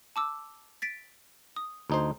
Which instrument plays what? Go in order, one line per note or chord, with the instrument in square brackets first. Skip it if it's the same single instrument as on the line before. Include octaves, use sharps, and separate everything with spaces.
[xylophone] A5 D6 E6
A6 B6 D7
D#6
[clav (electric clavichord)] D2 D#4 C5